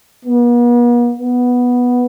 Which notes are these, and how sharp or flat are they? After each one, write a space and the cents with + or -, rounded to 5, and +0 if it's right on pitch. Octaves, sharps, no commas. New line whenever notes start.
B3 -45
B3 -5